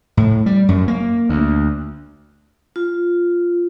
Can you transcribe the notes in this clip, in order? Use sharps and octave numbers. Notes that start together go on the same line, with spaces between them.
A2
G3
F#2
A#3
D2
F4